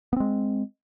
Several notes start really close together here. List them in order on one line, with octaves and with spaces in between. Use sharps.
B3 C4 G#3